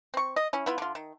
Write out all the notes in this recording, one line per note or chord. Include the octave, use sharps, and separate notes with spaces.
C4 C#6
D#5
C#4 E4
B3 E4 F4
D3 F4
D#3